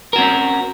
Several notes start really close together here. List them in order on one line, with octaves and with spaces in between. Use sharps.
A#4 F#4 C4 C#4